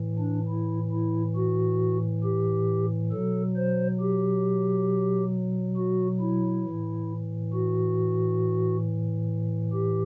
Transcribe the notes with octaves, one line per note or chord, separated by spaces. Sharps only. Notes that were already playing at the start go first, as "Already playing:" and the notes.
Already playing: A2 E3
D4
E4
E4
F#4
G4
B2 F#3 A4
C5
G4
F#4
E4
A2 E3
F#4
G4